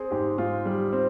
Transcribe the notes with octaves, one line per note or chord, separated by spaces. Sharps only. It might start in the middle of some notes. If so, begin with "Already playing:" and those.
Already playing: C4 G#4
G#2 G4
G#2 F4
G3
C4